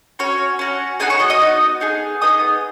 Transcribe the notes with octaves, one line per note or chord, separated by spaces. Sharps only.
C#4 F#4 C#5
C#4 F#4
B3 D#4 F#4 G#4 G#5
C#5 C#6
D#5 D#6
D#5 D#6
B3 D#4 F#4
B3 D#4 G#4
B3 D#4 G#4 D#5 D#6